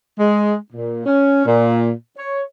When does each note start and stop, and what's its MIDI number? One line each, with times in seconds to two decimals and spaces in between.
0.19 0.53 56
0.72 1.04 46
1.05 1.42 61
1.46 1.90 46
2.17 2.42 73